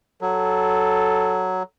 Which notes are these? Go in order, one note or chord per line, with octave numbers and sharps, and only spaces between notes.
F#3 A4